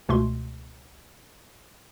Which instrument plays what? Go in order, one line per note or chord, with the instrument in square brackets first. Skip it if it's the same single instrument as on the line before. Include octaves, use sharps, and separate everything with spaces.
[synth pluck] C#2 B2 A3 C6